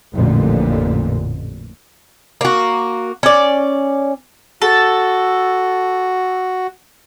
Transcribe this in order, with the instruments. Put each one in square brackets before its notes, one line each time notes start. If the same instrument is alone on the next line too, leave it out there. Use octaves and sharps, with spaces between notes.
[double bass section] A1 F2 A#2 D3
[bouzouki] A#3 F#4
C#4 D5
[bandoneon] F#4 [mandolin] A4